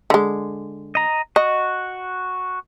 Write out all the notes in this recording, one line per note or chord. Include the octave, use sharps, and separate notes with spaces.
D3 G#3
D#5 A#5
F#4 D#5